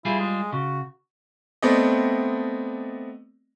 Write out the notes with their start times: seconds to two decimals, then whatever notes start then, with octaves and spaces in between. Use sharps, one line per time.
0.05 G3 E4 F4 G#4
0.19 G#3
0.52 C#3 F#4
1.63 A3 B3 C4 D5 D#5